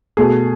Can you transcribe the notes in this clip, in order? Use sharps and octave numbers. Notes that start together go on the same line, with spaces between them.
B2 A3 G#4